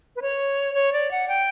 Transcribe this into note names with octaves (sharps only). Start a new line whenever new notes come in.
B4
C#5
C#5
D5
F#5
G5